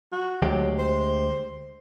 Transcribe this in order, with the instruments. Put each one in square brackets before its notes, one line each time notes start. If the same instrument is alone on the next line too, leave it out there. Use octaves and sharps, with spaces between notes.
[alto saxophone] F#4
[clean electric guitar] D2 G#3 G4 [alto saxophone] F#3
[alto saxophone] C5